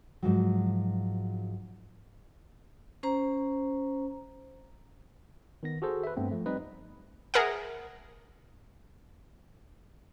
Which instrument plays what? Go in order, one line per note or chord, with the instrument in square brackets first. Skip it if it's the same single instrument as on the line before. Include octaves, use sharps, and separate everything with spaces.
[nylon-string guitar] G#2 F3 F#3
[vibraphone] C#4 C5 A#5
[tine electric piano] D#3 B3 A#6
F#4 G#4 A4 C5
B4 E5
G2 A3 B3 C4
F3 A3
G3 C4 D#4 B4 D#5
[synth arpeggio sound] G#4 A#4 E5 F#5